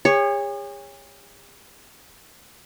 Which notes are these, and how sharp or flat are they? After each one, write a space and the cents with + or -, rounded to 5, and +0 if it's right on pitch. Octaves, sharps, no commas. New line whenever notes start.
G#4 -45 C#5 +0